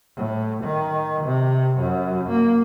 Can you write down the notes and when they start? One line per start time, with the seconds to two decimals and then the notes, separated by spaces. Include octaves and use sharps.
0.16 A2
0.63 D#3
1.24 C3
1.78 F#2
2.29 A#3